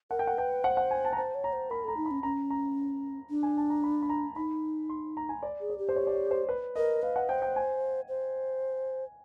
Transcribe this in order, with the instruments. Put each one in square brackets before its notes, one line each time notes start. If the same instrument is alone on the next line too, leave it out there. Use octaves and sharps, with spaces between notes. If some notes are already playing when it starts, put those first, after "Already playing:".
[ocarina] A#4 [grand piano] F#5
[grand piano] G5
F#5
[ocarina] B4 [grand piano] G5
[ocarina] C5 [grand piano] F#5
[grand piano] F#5
G#5
A5
A#5
[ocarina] C5 [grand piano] A5
[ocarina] C#5
[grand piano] A#5
[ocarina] C5
[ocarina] A#4 [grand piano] B5
[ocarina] A4 [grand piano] A#5
[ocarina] D#4
[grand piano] B5
[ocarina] C#4
[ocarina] C#4 [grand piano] A#5
[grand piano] A#5
[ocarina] D4
[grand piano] G#5
A5
A#5
B5
B5
A#5
[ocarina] D#4 [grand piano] B5
[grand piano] C6
A#5
G#5
D5
[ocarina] G#4
[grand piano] D5
[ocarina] G4
[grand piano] C5
C#5
D5
C#5
C5
B4
[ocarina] A#4 [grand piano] D#5
[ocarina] B4 [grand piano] F5
[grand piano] F#5
[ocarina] C5 [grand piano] G5
[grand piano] G5
G#5
[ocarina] C5